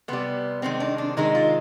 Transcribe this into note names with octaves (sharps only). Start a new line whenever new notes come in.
C3 G3 B3
C3 D#3 G#3 C4
D4
D4
C3 D#3 G#3 D#4
F4